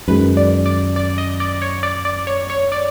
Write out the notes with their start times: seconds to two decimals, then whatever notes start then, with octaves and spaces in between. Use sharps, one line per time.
0.08 F#2 D#3 G#3 B4
0.37 D5
0.66 D5
0.96 D5
1.18 D#5
1.40 D5
1.62 C#5
1.83 D5
2.05 D5
2.27 C#5
2.50 C#5
2.72 D5